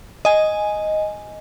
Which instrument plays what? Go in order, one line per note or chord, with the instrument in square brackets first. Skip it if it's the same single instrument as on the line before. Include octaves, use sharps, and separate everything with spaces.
[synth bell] D#5 G#5